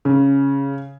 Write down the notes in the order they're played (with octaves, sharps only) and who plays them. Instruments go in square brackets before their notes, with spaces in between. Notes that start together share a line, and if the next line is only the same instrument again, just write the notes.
[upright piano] C#3